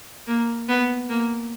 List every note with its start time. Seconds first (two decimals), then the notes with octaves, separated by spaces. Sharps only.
0.28 A#3
0.69 B3
1.09 A#3